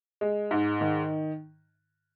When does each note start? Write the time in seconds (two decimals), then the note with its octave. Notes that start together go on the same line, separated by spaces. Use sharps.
0.21 G#3
0.51 G#2
0.81 D#3